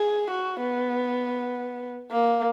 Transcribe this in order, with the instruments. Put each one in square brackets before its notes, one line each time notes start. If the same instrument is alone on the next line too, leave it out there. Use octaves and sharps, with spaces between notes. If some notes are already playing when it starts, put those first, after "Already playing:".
Already playing: [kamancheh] G#4
F#4
B3
A#3